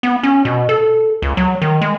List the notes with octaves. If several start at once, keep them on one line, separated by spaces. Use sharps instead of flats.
B3
C#4
B2
A4
C#2
F#3
D#3
G#3